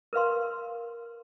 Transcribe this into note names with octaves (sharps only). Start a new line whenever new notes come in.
A#4 B4 F5 C6